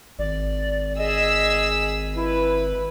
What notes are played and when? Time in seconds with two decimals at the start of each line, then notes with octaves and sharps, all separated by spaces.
0.19 G#1 D5
0.98 G#4 D#5 E6 B6
2.15 E4 B4